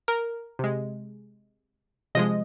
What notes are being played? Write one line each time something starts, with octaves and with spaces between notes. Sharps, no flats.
A#4
C3 G#3
C3 F3 G#3 D#5